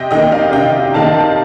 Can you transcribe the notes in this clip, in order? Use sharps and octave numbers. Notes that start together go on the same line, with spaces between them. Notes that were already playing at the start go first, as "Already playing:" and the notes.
Already playing: C3 D#5 G5
D#3 A#3 D#5 G5
D5 F5
C3 D#5 G5
D#3 A#3 F5 A5